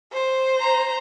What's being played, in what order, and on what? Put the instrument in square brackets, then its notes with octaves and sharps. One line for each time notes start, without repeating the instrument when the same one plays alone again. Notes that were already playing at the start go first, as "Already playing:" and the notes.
[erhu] C5
[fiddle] A#5